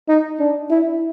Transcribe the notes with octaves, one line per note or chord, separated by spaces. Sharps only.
D#4
D4
E4